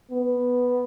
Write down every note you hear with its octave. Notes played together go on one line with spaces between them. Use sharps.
B3